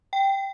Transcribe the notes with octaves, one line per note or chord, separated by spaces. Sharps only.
G5